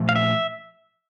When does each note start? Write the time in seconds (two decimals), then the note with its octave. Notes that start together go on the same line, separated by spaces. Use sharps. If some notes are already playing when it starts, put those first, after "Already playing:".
Already playing: A#2 F3 A3
0.09 F5
0.16 E5